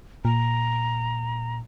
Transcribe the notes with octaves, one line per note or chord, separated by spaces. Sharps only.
A#2 A#5